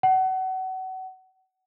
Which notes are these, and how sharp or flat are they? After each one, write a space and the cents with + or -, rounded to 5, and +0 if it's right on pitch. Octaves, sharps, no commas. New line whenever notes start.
F#5 +30